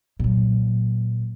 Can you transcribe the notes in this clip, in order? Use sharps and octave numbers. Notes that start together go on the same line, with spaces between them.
A#2 F#3